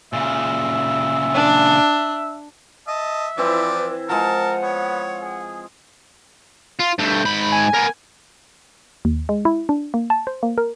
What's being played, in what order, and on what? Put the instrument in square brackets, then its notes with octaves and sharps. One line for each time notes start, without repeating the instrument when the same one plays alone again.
[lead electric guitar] A#2 C#3 [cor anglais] E5
[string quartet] D4
[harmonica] D#5 A5 [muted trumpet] E5
[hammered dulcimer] E3 C4 E4 [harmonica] F3 D5 [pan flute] B4
[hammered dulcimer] F3 G#3 [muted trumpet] A#4 [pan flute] F#5 [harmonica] A5
[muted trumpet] B3 [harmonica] C#5
[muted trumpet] G#4
[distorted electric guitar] F4
[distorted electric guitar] G2 A3 [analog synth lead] G6
[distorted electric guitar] G#2 B5
[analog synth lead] G#5
[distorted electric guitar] B3 A#4
[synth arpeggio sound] D#2
G#3
E4
D4
A#3
A5
C5
A#3
A#4